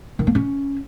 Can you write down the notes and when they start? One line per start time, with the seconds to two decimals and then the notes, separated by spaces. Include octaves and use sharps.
0.19 D#3
0.27 A#3
0.35 C#4